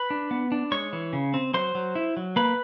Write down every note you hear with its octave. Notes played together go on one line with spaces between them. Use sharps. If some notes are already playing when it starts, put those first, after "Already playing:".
Already playing: B4 B5
D4
B3
D4
G#3 C#5 C#6
E3
C#3
C4
F#3 C5 C6
F#3
E4
F#3
A#3 B4 B5